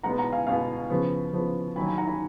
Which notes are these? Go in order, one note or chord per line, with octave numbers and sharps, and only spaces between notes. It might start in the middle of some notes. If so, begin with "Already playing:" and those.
B2 G#3 B3 F#5 A#5
F#5 A#5
F5 G#5
B2 G#3 B3 F5 G#5
C#3 F3 B3
C#3 F3 B3
D#3 F#3 A#3 G#5 B5
G#5 B5
F#5 A#5
G#5 B5